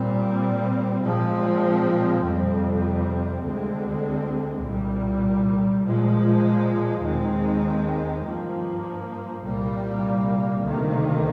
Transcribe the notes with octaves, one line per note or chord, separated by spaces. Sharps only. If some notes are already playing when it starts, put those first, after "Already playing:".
Already playing: A#2 G3 C4
A#2 F3 G#3 C4
F2 C3 G3 C4
D2 D3 G#3 C4
C2 A#2 G3
A#2 F3 G#3
D#2 D#3 G#3 C4
G2 F3 A#3
C2 A#2 G3 A#3
D2 C3 D#3 A#3